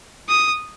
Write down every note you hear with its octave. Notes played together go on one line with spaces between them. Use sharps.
D#6